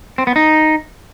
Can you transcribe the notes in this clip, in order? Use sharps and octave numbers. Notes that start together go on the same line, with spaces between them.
C4
B3
D#4